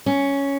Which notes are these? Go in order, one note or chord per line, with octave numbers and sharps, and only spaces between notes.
C#4